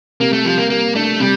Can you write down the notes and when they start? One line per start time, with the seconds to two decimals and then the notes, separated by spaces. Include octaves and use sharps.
0.21 C3 A#3
0.33 A3
0.45 F3 G3
0.58 A#3
0.70 G3 A#3
0.95 A3 D4
1.20 C3 G3